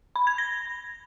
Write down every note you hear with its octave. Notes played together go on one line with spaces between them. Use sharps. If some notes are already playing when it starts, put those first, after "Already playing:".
B5
G#6
A#6